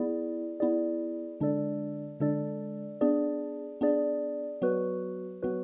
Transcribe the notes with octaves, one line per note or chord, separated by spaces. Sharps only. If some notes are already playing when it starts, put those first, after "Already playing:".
Already playing: B3 E4 G#4 D5
B3 E4 G#4 D5
D3 G#3 D4 A4 D5
D3 G#3 D4 A4 D5
B3 D4 G#4 D5
B3 D4 G#4 D5
F#3 B3 F#4 B4
F#3 B3 F#4 B4